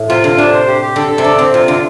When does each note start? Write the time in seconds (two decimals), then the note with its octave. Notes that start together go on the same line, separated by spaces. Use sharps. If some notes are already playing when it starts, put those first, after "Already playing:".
Already playing: A2
0.09 C3 F4
0.23 D3 F4
0.37 C3 D4
0.53 C5
0.67 G4
0.82 G4
0.96 D3 A4
1.11 A4
1.18 C3
1.24 D3 D5
1.39 D3 C4
1.54 C3 F4
1.68 D3 F4